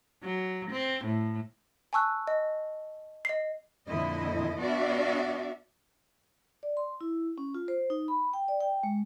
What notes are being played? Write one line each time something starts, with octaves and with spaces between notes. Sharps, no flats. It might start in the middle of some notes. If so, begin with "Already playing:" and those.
F#3
C4
A2
G#5 A5 C#6 E6 F#6
D#5
D#5 C7
F2 A#2 D3 E4 D#5
B3 D4 F#4 D5 E5 F5
D5
C6
E4
C#4
F4
C5
D#4
B5
G5
D5
G5
G#3